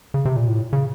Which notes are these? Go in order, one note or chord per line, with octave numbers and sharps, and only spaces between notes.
C#3
C3
A#2
A2
C#3